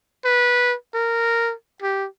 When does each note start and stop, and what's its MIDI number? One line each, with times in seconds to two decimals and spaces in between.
0.25 0.75 71
0.94 1.53 70
1.82 2.07 67